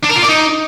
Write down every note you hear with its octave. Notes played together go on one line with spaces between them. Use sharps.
D4
A#4
F4
D5
D#4